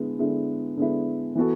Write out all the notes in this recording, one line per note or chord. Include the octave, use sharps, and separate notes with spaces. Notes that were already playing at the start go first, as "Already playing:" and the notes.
Already playing: D3 G#3 B3 E4
D3 G#3 B3 E4
D3 G#3 B3 E4
E3 B3 F#4 A4